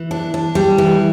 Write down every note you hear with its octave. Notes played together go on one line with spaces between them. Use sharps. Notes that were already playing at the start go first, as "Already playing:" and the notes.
Already playing: E3
D4
D4
G3
E3